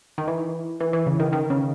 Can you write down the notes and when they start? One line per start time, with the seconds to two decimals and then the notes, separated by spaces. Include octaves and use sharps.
0.18 D#3
0.27 E3
0.80 E3
0.93 E3
1.06 C#3
1.20 D#3
1.33 D#3
1.50 C#3